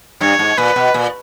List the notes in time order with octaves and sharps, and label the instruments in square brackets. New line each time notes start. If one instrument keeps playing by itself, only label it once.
[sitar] G2 [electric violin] C#5
[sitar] G#2
[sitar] A#2 [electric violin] B4
[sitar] B2
A#2